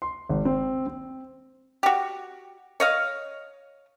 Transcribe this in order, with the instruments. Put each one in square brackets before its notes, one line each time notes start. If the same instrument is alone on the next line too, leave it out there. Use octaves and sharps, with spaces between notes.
[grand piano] C6
G#1
C4
C4
[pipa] F#4 G4
C#5 D#5 F5